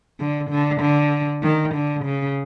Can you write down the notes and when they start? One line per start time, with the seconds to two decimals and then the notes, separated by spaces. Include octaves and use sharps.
0.19 D3
0.50 D3
0.81 D3
1.43 D#3
1.74 D3
2.05 C#3